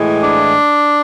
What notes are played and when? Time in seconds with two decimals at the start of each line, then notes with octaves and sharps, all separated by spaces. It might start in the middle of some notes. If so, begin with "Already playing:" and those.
Already playing: A2 E3 G#3
0.21 D4